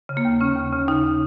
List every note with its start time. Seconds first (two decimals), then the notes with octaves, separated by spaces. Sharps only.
0.09 C#3
0.17 A#3
0.25 D#2
0.41 C#3 C#4
0.56 D#2
0.72 C#3
0.88 D#2 D#4
1.03 C#3